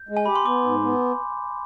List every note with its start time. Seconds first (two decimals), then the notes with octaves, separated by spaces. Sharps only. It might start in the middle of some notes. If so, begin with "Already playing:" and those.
Already playing: G6
0.09 G#3
0.17 G#5
0.26 G4 B5
0.36 C6
0.45 B3 D6
0.64 G#2
0.83 B3